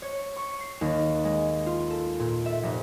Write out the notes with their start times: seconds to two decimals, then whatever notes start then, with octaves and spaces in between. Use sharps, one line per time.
0.02 C#5
0.36 C#6
0.60 C7
0.81 D#2
1.25 G#3
1.66 F4
1.90 A4
2.20 A#2
2.46 E5
2.63 F1